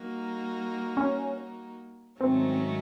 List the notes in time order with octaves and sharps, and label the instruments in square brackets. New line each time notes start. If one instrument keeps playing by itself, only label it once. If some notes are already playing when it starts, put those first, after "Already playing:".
Already playing: [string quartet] G3 A#3 D#4 F#4
[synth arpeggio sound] C#4
[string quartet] G#2 D#3 F#3 A3 C#4 [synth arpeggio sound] C4